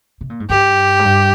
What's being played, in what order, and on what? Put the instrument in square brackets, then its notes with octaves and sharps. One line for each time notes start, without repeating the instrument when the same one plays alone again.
[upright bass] C3
A#2
G#2
[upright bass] G2 [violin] G4
[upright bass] G#2
G2